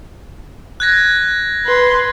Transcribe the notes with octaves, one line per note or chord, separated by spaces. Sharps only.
F#6 G#6 A#6
B4 C6